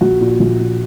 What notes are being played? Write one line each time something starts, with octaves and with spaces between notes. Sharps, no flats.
A#1 F#4
A#2
A#1
A#2